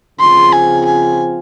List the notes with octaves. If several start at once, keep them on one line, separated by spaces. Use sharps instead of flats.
C#3 F3 C4 F4 G#4 C6
G#5
G#5